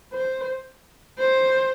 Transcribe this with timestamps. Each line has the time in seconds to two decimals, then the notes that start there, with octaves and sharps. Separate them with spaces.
0.13 C5
1.19 C5